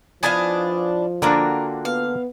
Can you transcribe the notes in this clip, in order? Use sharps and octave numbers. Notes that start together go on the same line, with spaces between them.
F3 B3 D4 E4 D#5 F5 G#5
D3 A#3 D4 F4 F#4 A#4 G5
B3 F5